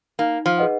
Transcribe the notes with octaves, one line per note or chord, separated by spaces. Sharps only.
A#3 D#4
F3
G#4 B4 D#5 F#5